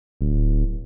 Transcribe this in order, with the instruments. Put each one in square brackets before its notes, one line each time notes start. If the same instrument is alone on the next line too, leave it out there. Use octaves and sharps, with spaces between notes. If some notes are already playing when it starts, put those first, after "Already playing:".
[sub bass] D1